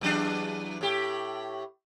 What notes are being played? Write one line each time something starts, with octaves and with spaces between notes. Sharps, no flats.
E2 F#3 D4
A2 G4